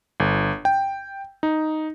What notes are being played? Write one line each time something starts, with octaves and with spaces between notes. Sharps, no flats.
G1
G5
D#4